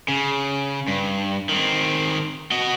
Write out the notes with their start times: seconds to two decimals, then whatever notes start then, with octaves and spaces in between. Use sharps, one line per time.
0.08 C#3
0.88 G2
1.49 D#3 C4
2.51 F#4 D#5